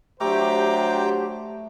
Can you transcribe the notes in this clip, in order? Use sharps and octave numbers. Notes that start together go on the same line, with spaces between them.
F#3 A3 D4 G4 C5 G5 A#5 D6